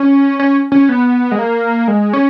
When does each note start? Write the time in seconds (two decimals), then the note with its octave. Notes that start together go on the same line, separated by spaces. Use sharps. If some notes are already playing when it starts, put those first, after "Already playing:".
Already playing: C#4
0.39 C#4
0.72 C#4
0.89 B3
1.32 G#3
1.39 A#3
1.88 G#3
2.13 C#4